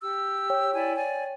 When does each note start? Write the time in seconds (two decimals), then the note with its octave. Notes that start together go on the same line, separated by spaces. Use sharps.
0.02 G4 E6
0.50 C#5 G5
0.73 E4 D5 G#5
0.97 D5 G#5